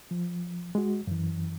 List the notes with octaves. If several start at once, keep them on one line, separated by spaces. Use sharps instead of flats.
F3
G#3 F#4
F#2 E3